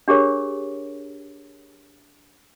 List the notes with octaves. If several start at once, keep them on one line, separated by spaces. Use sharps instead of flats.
D4 G4 G#4 A#4 C#5